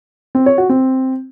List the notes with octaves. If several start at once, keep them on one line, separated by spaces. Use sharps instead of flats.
C4
C#5
F#4
C4